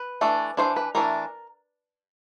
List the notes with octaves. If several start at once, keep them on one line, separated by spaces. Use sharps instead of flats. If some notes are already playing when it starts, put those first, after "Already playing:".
Already playing: B4
E3 A3 D4
E3 A3 D4 C5
B4
E3 A3 D4 A#4